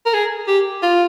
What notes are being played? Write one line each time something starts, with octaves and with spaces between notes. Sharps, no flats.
A#4
G#4
G4
F4